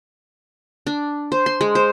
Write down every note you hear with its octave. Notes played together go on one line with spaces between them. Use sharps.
D4
C5
C6
G#3
C5